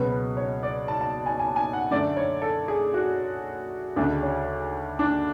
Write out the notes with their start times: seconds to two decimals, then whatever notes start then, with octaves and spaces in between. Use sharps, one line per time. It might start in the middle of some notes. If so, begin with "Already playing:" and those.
Already playing: C#2 B2 F#3 B3 B4
0.11 B4
0.37 C#5
0.63 D5
0.88 A5
1.01 A5
1.26 G#5
1.39 G#5
1.56 G#5
1.73 F#5
1.91 F#2 D3 A3 D5
2.17 C#5
2.42 A4
2.68 G#4
2.94 F#4
3.96 D2 C#3 G#3 D4
4.23 C#4
4.99 D4